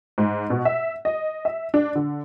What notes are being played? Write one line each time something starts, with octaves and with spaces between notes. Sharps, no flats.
G#2
B2
E5
D#5
E5
D4
D3